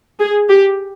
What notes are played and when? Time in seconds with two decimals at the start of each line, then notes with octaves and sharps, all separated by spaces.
0.19 G#4
0.49 G4